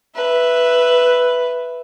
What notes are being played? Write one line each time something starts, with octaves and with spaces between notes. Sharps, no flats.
B4 E5